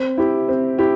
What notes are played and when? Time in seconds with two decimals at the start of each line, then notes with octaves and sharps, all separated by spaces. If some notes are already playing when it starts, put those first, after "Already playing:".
Already playing: C4
0.18 E4 G4
0.48 C4
0.78 E4 G4